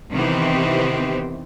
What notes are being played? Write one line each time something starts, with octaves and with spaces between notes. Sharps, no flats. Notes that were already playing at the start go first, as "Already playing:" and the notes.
C3 D#3 E3 B3 C4 G4